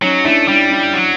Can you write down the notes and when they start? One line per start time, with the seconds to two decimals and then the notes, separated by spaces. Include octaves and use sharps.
0.02 F#3 C#4 D#4
0.25 A3 D4 E4
0.48 G3 D4 E4
0.71 D4 E4
0.94 F#3